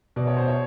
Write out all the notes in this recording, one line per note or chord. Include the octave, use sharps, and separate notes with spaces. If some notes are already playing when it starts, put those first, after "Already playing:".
B2 D5
C#5
C5
C#5